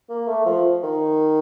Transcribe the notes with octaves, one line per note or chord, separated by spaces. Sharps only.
A#3
A3
F3
D#3